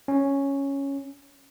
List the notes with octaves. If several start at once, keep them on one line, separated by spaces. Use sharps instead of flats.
C#4